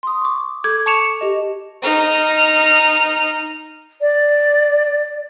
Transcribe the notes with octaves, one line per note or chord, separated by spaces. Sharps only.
C6 D#6
C#6 D6
A4 D6 G6 G#6
A5 C#6 D6 C#7 E7 F7
G4 D#5
D#4 F6
D5